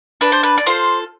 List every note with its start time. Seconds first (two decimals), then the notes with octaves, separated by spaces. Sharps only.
0.21 D4 B4
0.32 C5
0.43 B4
0.58 D5
0.66 F4 A4 C5